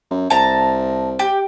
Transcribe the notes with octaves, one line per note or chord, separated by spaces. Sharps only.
F#2
C2 A5 A#5
G4